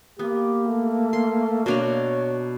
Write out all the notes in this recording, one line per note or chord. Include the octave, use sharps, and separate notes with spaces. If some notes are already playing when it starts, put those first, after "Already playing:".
A#3 B3 G4
A3
C6
B2 D4 C#5 A#5